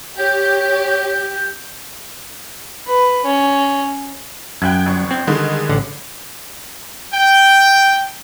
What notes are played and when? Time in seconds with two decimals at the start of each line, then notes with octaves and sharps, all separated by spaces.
0.19 G4 C#5 G6
2.87 B4
3.25 C#4
4.62 F#2 G5 F#6 G#6
4.86 G1 C#6
5.11 C4
5.27 D3 D#3 G3 G#3
5.69 A1 D3
7.14 G5